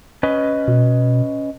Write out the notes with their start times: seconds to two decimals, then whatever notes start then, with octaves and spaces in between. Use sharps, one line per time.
0.23 C#4 B4 D#5
0.68 B2